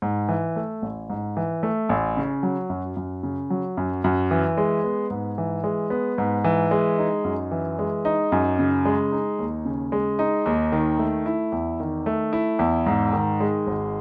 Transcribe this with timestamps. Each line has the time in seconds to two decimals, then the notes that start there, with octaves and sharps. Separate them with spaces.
0.02 G#2
0.29 E3
0.56 A3
0.82 A1
1.10 G#2
1.37 E3
1.63 A3
1.89 A1
2.17 C#3
2.43 F#3
2.70 F#2
2.96 F#2
3.23 C#3
3.50 F#3
3.77 F#2
4.04 F#2
4.31 E3
4.57 G#3
4.84 B3
5.10 G#2
5.38 E3
5.64 G#3
5.90 B3
6.18 G#2
6.44 E3
6.71 G#3
6.98 D#4
7.24 F#2
7.51 E3
7.79 G#3
8.05 D#4
8.32 F#2
8.59 C#3
8.85 G#3
9.12 D#4
9.39 D#2
9.65 C#3
9.92 G#3
10.19 D#4
10.46 D#2
10.72 D#3
10.99 A3
11.26 E4
11.52 E2
11.80 D#3
12.06 A3
12.33 E4
12.59 E2
12.86 G#2
13.13 D#3
13.40 G#3
13.67 G#1